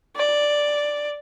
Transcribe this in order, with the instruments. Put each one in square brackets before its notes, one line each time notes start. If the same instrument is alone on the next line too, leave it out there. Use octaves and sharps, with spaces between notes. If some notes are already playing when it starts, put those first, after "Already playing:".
[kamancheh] D5